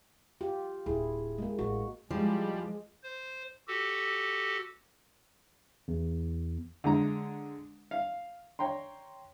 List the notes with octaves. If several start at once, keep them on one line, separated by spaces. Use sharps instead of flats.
F4 G4
D1 E4 G#4
G#3 A#3
A1 F#4
F3 G3 G#3
C5
F#4 G4 A4
E2
D3 G#3 A#5
F5
C#5 G5 A#5 C6